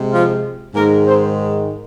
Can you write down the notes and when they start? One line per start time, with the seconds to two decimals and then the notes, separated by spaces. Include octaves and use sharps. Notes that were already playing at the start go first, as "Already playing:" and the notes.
Already playing: C3 G#3
0.12 F3 F4
0.75 G#2 D#3 G#3 A#3 A#4
1.05 C4 C5